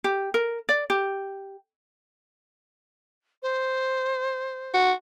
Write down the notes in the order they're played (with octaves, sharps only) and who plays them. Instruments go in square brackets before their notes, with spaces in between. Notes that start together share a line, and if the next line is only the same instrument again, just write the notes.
[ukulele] G4
A#4
D5
G4
[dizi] C5
[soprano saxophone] F#4